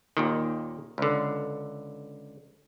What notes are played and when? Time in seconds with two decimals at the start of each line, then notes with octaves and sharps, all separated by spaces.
0.17 D#2 A#2 D#3
0.98 C#2 D3